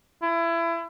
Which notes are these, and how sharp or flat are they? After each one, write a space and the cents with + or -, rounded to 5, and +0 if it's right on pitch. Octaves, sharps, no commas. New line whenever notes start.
E4 +25